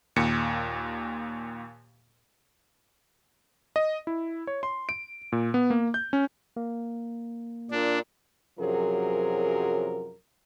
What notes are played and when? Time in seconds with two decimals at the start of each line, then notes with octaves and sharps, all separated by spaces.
0.16 D#2 A#2 C#7
3.76 D#5
4.07 E4
4.47 C#5
4.63 C6
4.89 D7
5.32 A#2
5.54 B3
5.70 A#3
5.94 G6
6.13 C#4
6.57 A#3
7.71 A#2 D4
8.60 F#2 C3 F3 F#3 G#4 A#4